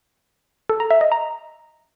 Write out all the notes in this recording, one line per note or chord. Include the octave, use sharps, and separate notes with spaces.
A4
A#5
E5
D#5
A#5